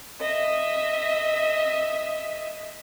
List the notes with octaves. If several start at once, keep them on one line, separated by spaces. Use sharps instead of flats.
D#5 E5